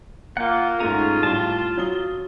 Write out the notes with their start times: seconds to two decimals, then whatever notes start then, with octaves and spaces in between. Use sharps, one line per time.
0.37 A#3 F4 F#5
0.80 G#2 A3 C#4 F4 G#4 A#5 D#7
1.23 A2 G3 A5 C6
1.77 F#3 D#6 G7